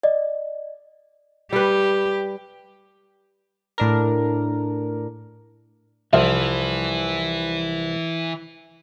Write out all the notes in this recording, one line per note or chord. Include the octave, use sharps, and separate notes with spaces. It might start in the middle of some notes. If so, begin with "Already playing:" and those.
D5 D#5
G3 G4 B4
A2 D4 A#4
C2 E3 F3 F4 E5